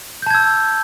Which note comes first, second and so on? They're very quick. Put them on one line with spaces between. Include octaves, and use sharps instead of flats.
G6 A5 G#6 E6